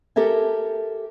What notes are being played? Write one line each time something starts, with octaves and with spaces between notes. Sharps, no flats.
G4 A4 A#4 E5 G#5